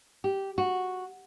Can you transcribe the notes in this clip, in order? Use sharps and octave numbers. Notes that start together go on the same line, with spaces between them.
G4
F#4